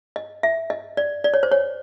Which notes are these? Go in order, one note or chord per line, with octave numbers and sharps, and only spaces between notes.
D#5
E5
D#5
D5
D5
C#5
C5
C#5